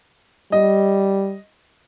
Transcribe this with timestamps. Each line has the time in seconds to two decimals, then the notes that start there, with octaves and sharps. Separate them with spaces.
0.52 G3 D#5